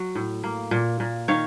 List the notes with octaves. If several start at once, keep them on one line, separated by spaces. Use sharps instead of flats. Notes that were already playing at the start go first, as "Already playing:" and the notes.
Already playing: F#3
A2
A#3
A#2
A#2
D#3 C#5 F5